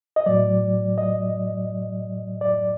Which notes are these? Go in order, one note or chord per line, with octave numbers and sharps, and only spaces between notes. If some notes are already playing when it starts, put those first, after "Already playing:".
D#5
A2 F#3 D5
D#5
D5